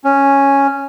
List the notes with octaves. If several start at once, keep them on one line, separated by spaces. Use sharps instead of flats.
C#4